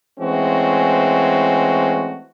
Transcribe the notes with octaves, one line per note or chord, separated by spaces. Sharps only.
E3 G#3 A3 C4 C#4 F#4